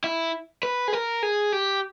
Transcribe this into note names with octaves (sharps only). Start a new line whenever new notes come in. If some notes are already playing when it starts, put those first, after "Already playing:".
E4
B4
G#4
A#4
G#4
G4